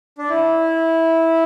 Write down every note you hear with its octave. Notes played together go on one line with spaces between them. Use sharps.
D4
E4